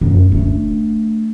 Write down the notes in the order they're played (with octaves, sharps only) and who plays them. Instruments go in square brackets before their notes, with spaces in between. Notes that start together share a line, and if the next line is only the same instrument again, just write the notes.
[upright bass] F#2 A2
A3 D4